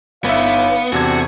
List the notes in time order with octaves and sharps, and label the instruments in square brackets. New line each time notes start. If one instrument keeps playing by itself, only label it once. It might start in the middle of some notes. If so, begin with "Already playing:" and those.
[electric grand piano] G1 E5 [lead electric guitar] B3 [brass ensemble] D#4 C#5 F5
[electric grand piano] E2 C3 G#6 [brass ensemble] C4 D4 A4 [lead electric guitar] F#4